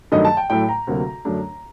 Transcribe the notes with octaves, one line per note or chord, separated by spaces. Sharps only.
G2 D#3 F#3 A3 D#4 D#5
A5
G5
A2 F#3 A3 G5
A#5
D2 C3 F#3 A#3
F#2 D3 F#3 A3 D4